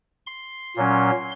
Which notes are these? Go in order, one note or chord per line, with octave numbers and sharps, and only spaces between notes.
C6
A#2 F#3 C#4